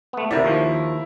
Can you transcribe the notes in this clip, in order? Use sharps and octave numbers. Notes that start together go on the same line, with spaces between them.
A3 B3
C3 E4 A#4 D5
D#2 F3